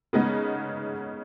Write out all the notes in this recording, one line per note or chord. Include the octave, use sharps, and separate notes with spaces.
C#3 G#3 B3 D#4